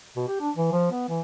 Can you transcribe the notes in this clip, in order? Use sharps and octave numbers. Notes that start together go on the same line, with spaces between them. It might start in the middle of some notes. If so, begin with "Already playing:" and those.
B2
G4
D4
E3
F3
B3
E3